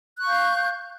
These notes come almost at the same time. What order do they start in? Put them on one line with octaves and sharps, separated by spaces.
F#6 C#6 F5 G6